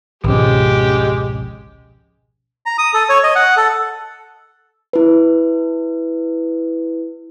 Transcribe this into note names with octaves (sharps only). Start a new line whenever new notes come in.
G#1 C#2 B2 F3 G#3 C#4 G4
A#5
D#6
A4
C#5
D#5
F#5
A4
E4 B4